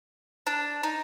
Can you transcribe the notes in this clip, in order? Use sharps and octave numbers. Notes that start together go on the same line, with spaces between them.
D4
D#4